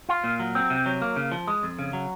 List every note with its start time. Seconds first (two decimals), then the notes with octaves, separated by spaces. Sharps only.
0.09 F4
0.24 A#2
0.40 F#3
0.55 C4
0.70 C3
0.86 F#3
1.02 A#3
1.16 C#3
1.32 F3
1.48 G#3
1.63 F2
1.79 C#3
1.93 F#3